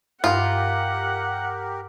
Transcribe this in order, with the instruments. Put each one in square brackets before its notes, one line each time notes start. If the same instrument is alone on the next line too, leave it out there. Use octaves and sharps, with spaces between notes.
[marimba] G2 [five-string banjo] F4 [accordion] G4 A#4 [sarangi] F#5